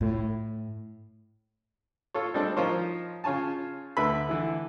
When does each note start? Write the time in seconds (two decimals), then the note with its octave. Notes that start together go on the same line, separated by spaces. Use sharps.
0.01 A2
2.14 F4 A4 C#5
2.34 G3 G#3 C4 D4 A4
2.57 F3 D#4 F4 A#4 C5 C#5
3.24 C#3 F4 C#5 G#5 A5
3.97 D2 D3 B4 E5 B5
4.29 D3 E3 E4